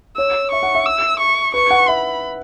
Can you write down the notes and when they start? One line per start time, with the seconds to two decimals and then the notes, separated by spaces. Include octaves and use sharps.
0.17 C#5 E6
0.51 E5 C#6
0.63 F#5
0.75 E5
0.86 E6
1.20 C#6
1.54 B4 C#6
1.71 F#5
1.88 E5 B5